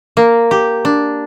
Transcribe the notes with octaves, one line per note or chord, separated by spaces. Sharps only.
A#3
G4
D4